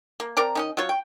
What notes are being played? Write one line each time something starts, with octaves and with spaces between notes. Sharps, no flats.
A#3
C4 A#4 D5 A#5
D#3 C#4 D#5
F#3 C#4 F4 C#5
G5